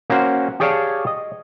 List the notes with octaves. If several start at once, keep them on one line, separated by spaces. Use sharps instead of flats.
A#3 C#4 F#4 C5
G4 G#4 C#5 D5 F5 A5
D#5